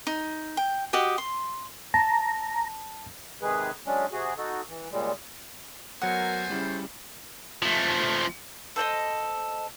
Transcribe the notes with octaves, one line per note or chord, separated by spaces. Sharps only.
D#4
G5
F#4 G4 D#5 G5
C6
A5 A#5
C3 D#3 G#3 G#4 B4
F#3 G#3 C#4 D4
C3 F#4 G#4
D#4 F#4 A4
E3
A#2 C#3 G3 G#3
F#3 A3 B3 A#4 C5 F#5 G#5
C#3 G3 E4
F3 A3
A4 C5 D5 D#5